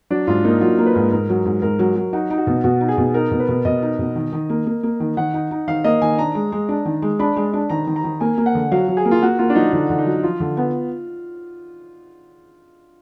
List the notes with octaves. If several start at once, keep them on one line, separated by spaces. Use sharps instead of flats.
F#3 D4
G#2 F4
A#3 D#4
F#3 F4
A#3
B4
G#2
G#2 A#4
F#3
G#2
G#2 A#4
F#3
F#3
D#4 F#4
D#4
F#4
B2
B2 F#4
D#4
G#4
B2
D#4 A#4
B2
B4
B2
B2 D#5
D#4
B2
D#3
D#3
A#3
A#3
A#3
D#3
D#3 F#5
D#4
D#4
D#3 F5
A#3 D#5
D#3 G#5
D4 A#5
G#3
G#3
D4
D#3
G#3
D4 B5
G#3
D4
D#3 A#5
D#3
A#5
D#3
A#3 G#5
A#3
F#5
D3
F#3 F5
F#3
G#4
A#3
F4
A#3 F#4
A#3 F4
D4
F#3 D#4
D3 D#4
D3
D#4
F#3
F3 F4
D3
B3